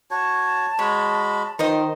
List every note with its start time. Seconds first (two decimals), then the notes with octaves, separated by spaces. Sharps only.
0.11 F#4 C#5 A5
0.79 G#3 F#4 C#5 B5
1.59 D#3 D#4 F4 C5 D#5